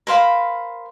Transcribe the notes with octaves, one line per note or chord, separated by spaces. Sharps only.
A#4 C5 F5 B5